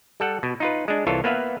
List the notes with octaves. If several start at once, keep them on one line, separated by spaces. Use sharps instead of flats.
G3 A4 F#5
B2
D#4 F4 B4
G#3 D4
C2 E3 F4 A4 C#5
A#3 B3 B4 E5 F5